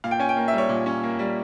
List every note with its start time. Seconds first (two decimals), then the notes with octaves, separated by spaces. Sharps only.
0.04 A#2 F5
0.11 G5
0.19 C#4 G#5
0.29 G5
0.37 A#3
0.48 E5
0.53 G3
0.58 C#5
0.69 A#2
0.86 C#4
1.03 A#3
1.19 G3